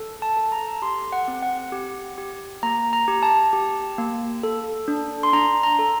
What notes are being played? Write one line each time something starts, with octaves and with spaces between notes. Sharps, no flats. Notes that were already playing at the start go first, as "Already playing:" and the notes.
Already playing: A4
A5
A4
A#5
G4 C6
F#5
C4
F#5
G4
G4
A#3 A#5
A#5
G4
A5
G4
A#3
A4
D4
C6
D4 A#5
A#5
A4